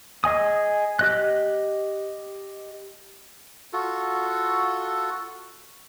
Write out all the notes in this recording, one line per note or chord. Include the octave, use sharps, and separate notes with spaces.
G#4 D#5 G#5 D#6
G4 D#5 F#6
F4 F#4 A4